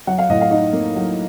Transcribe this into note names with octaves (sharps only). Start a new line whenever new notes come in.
F#3 F#5
F5
A2 D#5
F5
D#4
A#3
F#3